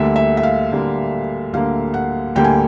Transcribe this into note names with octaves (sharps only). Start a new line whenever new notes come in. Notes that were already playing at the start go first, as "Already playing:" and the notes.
Already playing: D2 D3 G3 A#3 E5
E5
E5
F5
D2 D3 G3 A#3
D2 D3 G3 A#3 F5
F#5
D2 D3 G3 A#3 G5
G#5